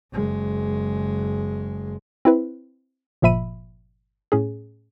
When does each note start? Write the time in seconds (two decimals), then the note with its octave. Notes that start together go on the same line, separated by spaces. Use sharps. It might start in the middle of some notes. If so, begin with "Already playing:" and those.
0.13 F#1 G#3
2.25 C4 E4 B4
3.22 G1 A#2 F3 E5 B5 D#7
4.32 A2 C#4 G#4